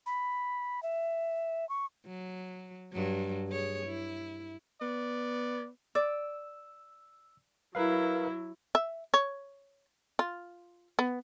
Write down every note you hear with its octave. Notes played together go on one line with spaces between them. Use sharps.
B5
E5
C#6
F#3
G2 F#3
G#4 C#5
E4
B3 D5
D5 E6
F#3 E4 A#4 B4 F5
E5
C#5
F4
B3